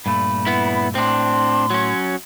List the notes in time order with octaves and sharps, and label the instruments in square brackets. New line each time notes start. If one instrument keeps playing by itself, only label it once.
[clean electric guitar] G2 A#2 A3 [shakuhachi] B5
[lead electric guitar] B3 E4
[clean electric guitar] A2 [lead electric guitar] C4 D4 [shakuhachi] C6
[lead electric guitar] F#3 C#4